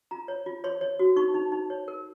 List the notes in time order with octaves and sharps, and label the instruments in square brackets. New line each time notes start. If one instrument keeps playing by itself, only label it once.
[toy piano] F4 A#5
C#5
F4
C#5 C6
C#5
F#4
D#4 C#6
D#4
D#4
C#5
A#4